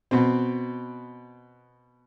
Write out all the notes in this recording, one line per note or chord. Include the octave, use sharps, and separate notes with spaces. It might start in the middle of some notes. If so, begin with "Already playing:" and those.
B2 C4